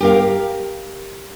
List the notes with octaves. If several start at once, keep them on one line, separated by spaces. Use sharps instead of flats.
G4 A#4 F5